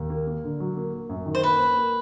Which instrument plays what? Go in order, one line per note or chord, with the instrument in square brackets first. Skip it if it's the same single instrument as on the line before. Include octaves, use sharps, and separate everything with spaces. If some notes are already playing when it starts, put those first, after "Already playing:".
Already playing: [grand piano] D#2
A#3
A#3
D3
F#3
A#3
A#3
F#2
D#3
[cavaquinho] C5
[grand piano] A#3 [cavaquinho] B4
[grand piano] A#3
A#3